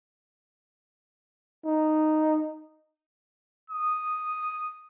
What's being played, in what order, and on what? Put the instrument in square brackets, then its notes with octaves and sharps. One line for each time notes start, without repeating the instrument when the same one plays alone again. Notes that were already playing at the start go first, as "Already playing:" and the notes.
[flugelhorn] D#4
[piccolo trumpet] D#6